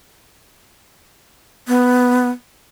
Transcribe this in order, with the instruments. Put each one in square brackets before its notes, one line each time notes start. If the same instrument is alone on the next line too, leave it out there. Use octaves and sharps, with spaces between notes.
[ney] B3